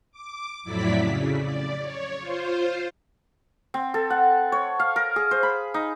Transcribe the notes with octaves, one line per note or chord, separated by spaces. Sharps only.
D6
F2 A2 F#3 E4 D5 B6
C#3
D5
C#5
F4 C5
C4
A4
F#5
C#5
F5
A#4
G#4
C5
B5
D#4